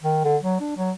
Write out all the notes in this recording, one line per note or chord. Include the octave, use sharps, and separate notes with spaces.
D#3
D3
F#3
D4
F#3